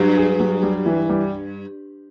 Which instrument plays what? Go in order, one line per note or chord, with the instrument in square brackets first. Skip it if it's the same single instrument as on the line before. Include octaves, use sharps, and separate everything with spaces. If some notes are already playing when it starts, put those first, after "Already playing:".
Already playing: [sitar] G2 [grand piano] F#3
[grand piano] G#4
F#3
G3
E3
G3